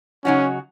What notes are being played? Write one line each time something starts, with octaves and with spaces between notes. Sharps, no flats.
C#3 F#3 C#4 D#4 F#4